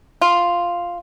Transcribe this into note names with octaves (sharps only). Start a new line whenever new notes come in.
F4